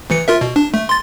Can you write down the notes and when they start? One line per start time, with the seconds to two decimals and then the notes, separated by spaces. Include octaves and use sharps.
0.10 D2 E3 C#7
0.28 F4 A#4 E5
0.41 B2
0.56 D4
0.74 A3
0.89 C6 A6